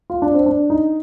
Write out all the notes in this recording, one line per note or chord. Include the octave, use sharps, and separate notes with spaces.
F4
D4
C4
D4
D#4